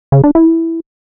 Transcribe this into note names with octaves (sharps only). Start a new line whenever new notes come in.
C#3
D4
E4